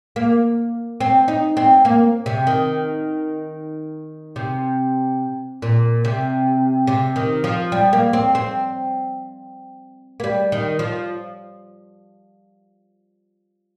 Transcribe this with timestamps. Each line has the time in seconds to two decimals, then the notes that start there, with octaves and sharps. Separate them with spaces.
0.16 A#3
1.01 C4
1.28 D#4
1.57 C4
1.85 A#3
2.26 C3
2.47 D#3
4.36 C3
5.62 A#2
6.05 C3
6.87 C3
7.16 D#3
7.44 F3
7.72 G3
7.93 A#3
8.13 C4
8.35 C4
10.20 A#3
10.24 G3
10.52 D#3
10.79 F3